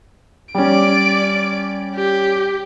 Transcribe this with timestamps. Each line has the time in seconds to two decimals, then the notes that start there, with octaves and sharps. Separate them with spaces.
0.54 G3 C#4 D5 D7
1.96 G4